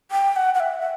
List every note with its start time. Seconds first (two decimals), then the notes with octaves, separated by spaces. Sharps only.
0.11 G5
0.36 F#5
0.55 F#5
0.60 E5
0.80 F#5